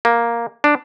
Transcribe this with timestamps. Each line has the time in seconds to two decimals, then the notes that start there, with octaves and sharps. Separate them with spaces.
0.05 A#3
0.64 D4